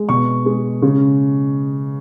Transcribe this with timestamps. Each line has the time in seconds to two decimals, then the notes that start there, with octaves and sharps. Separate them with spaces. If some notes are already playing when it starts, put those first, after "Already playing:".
Already playing: G#3
0.09 B2 C#6
0.46 G#3
0.82 C#3